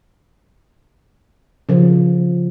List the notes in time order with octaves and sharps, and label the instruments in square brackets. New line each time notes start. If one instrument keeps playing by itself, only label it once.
[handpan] C#3 F3